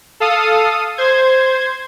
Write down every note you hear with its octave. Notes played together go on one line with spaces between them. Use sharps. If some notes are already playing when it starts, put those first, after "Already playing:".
A4 F5 D#6
C5 G#6